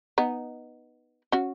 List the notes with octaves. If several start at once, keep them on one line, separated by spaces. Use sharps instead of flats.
B3 D#4
C#4 F#4